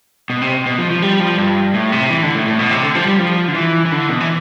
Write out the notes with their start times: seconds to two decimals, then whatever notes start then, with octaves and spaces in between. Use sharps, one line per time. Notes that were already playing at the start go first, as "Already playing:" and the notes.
0.30 B2
0.42 C3
0.66 B2
0.78 F3
0.90 F3
1.02 G3
1.20 F3
1.38 G2
1.74 A2
1.92 C3
2.10 E3
2.23 D3
2.34 A2
2.47 A2
2.59 B2
2.71 C3
2.82 D3
2.95 F3
3.06 G3
3.19 F3
3.48 D3
3.55 E3
3.85 E3
3.92 D3
4.09 B2
4.20 E3